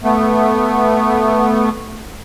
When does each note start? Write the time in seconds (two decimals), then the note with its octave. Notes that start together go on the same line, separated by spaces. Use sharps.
0.04 A3 B3